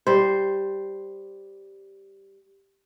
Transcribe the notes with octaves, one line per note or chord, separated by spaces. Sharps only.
G3 C5